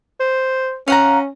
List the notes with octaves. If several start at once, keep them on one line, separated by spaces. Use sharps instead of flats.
C5
C#4 F5 F#5 A#5